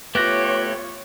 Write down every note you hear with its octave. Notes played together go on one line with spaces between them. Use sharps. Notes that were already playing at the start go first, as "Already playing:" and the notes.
A3 B3 F4 G4 B4 C#5 F#6 A#6